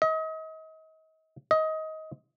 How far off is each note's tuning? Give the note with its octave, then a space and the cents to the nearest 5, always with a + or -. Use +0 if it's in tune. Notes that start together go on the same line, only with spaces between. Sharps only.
D#5 +35
D#5 +20